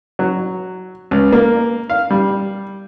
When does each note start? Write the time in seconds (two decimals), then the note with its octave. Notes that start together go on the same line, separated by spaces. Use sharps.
0.19 F#3
1.11 C#2
1.33 A#3
1.90 F5
2.10 G3